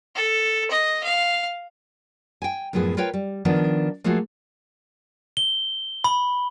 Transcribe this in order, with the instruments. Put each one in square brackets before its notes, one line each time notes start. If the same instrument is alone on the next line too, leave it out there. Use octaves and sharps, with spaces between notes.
[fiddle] A4
D#5
F5
[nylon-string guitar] G5 G#5
F#2 A2 F3 B3 G#4 B4
F4 A#4 B4 C#5 G5
G3
D#3 F3 B3 D4
F3 A3 A#3 F4 F#4 G#4
[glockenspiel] G7
B5